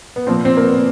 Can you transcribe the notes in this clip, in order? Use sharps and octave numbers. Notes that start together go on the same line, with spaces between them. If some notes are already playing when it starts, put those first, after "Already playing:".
B3
A#2 F3 C4
C4
A#3
B3